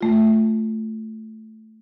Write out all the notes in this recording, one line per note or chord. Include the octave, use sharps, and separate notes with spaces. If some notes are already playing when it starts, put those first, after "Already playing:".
A3 F4